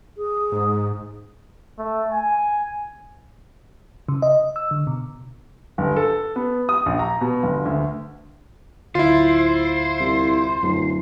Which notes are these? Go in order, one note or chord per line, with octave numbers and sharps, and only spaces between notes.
G#4
G#2
A3
G#5
C#3
D#5
E6
D3
B2
G1
A4
B3
D#6
A#1
A#5
B2
G1
D2
D1 D2 E4 F4 C5
C2
D1 F#2